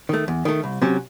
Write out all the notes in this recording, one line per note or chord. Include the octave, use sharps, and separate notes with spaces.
D#3 A3
E2
D#3 A3
C2
C3 F#3 C#4